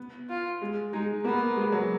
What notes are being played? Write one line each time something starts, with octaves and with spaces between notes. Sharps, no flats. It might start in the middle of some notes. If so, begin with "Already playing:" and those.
Already playing: B3
F4
G#3
G#3 D#4
A#3 B3
G#3
F#3